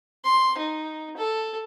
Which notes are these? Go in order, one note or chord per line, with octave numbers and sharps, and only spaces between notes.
C6
D#4
A4